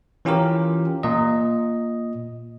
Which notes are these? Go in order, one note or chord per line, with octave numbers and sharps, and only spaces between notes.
E3 C#4 F4 G4 A#4
A#2 D#5